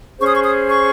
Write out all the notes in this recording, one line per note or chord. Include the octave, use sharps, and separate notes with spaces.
C#4 G#4 C5 C#6
D#6
C#6
D#6
C#6